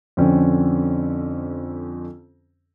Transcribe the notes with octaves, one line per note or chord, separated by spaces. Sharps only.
F2 D3 C4 C#4